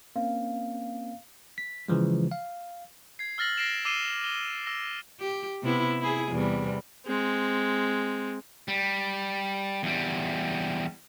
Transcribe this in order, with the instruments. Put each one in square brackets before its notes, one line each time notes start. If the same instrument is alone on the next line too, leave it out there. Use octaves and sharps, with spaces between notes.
[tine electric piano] A#3 C4 C#4 [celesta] F5
[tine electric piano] B6
C#3 E3 F3 G#3
F5
[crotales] G#6 C7
E6 F6 A6 A#6 F#7
A#6 C7 D7 E7
D6 E6 C7 D#7 E7 G7
G7
E6 A#6
[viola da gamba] G4
C3 B3 E4
E4 G#4
E2 C3 G3
[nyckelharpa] G#3 C4
[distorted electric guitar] G3
E2 G3